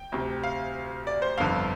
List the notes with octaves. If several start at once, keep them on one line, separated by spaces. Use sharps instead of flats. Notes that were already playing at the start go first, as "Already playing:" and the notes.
Already playing: G5
D2 C3
F5
D5
C5
G1 F2 D3 F5